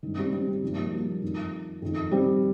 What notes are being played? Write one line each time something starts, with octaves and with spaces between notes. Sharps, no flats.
G2 D#3
G3 C4
G3 C4
G3
G2 D#3 F3
A#3
G3
F3 A#3
F2 D#3
F2 D#3
G3 C4